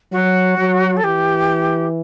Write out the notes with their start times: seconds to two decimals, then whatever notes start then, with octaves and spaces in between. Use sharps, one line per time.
0.12 F#3 F#4
0.58 F#3
0.97 A4
1.03 E3 G4